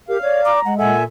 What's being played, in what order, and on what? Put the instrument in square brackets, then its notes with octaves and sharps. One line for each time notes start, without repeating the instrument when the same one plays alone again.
[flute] G4 [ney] A#4 [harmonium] F5
[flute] C#5 [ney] D5
[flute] A#5 [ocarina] D6
[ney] G#3 [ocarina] F#5
[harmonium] A#2 A4 E5 [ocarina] F#5 [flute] G#5